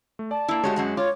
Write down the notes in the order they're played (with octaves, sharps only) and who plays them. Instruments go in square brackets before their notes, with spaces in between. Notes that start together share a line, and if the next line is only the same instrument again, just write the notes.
[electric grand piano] A3
[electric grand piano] D5 [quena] A5
[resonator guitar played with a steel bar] A#3 E4
[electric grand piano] G#3 F#4 [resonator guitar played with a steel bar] A3 G4 C#5
[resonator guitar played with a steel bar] F#2 F#3 F#5
[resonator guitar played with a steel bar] F4 [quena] C#5 [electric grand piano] D6